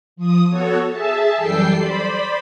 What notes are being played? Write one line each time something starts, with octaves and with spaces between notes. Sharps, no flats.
F3 D#6
B3 F#4 A4 C#5
G#4 E5 A5
F#2 E3 G3 A4 G5 C7
C5 D5 B5